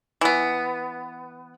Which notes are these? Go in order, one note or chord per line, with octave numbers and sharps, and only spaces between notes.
E3 B3